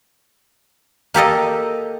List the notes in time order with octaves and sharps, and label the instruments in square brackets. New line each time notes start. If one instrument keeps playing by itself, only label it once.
[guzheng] A#3 G4 A4 D#5